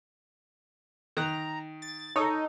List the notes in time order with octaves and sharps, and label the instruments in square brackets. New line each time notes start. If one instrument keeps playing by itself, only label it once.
[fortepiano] D#3 F#6 [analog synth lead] A#5
[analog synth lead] A6
[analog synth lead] D#4 [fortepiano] A4 C#5